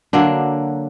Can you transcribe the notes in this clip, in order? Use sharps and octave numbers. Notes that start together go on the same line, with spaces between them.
D3 F#3 A#3 D4